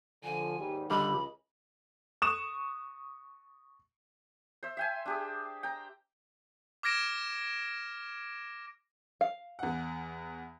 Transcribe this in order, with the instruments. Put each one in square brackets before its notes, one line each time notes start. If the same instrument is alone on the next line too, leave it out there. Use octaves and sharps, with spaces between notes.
[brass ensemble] D3 F3 [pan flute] G#5
[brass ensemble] D#2 G#2 G3
[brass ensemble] C#2 D#5 [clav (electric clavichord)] D3 G3 [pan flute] B5
[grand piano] C#6 D#6 E7
[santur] C5 E5
E5 G5 G#5
D4 G4 G#4
G5 A#5
[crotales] D6 F6 G#6 A#6 D7 E7
[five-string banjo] F5
[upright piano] E2 F#5